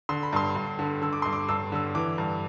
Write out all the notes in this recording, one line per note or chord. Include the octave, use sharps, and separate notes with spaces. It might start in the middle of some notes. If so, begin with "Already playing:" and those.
D3 C6
B5
G2 C6
G2
D3
D3 E6
D6
G2 C6
D6
G2 E6
D3 E6
E3 D6
G2